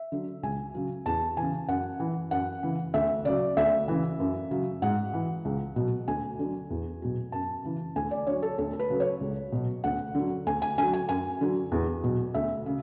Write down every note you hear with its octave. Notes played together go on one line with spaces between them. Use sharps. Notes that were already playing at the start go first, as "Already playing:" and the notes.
Already playing: E5
D3 F#3
C#2 G#5
C#3 F#3
E2 A5
C#3 E3 G#5
F#2 F#5
E3
F#2 F#5
C#3 E3
D2 E5
C#3 F#3 D5
D2 E5
C#3 E3
F#2
C#3 F#3
G#2 F#5
E3
C#2
B2 F#3
D2 G#5
D3 F#3
E2
B2 F#3
F#2 A5
C#3 E3
D2 G#5
D5
D3 F#3 C#5
A4
D2 A4
A4
B4
C#3 F#3
C#5
C#2
B2 F#3
D2 F#5
D3 F#3
D2 G#5
G#5
D3 F#3 G#5
G#5
F#2 G#5
D3 F#3
E2
B2 F#3
D2 E5
C#3